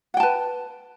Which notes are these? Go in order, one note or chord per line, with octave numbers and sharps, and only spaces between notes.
B4 F#5 G5 A5